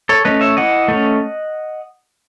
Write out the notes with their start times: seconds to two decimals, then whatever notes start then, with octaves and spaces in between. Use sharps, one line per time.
0.09 A4 C#5
0.25 A3 C#4 B4 D#5
0.41 C#5 E5
0.57 E3 D#5 F#5
0.88 A3 C#4